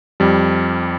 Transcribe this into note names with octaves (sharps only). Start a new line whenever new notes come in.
F2 G3